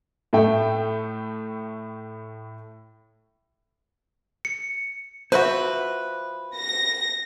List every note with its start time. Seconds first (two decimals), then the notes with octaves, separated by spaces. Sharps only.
0.33 A2 A3 G5
4.45 C#7
5.32 F3 F#4 B4 C5 E5
6.55 A#6